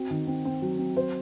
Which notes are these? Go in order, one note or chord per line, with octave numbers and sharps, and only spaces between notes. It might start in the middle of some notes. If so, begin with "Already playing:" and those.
Already playing: C4 F#4
D#3
C4
C4
F#3
C4
C5